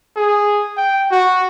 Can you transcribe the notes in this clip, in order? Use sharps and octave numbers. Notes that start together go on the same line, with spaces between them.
G#4
G5
F#4